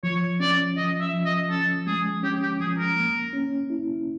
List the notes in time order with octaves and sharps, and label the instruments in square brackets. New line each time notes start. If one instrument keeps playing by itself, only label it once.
[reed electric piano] F3 [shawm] C#5
[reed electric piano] C#4 [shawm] D5
[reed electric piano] F3 [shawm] D#5
[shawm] E5
[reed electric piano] F3
[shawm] D#5
[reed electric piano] C#4 [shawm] A4
[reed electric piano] G#3 [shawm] G#4
[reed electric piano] C#4 [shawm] G4
[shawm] G4
[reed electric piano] F3 [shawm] G#4
[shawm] A#4
[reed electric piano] A#3
C#4
E4